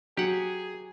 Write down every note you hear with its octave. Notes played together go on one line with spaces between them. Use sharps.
F#3 G4 G#4 F#5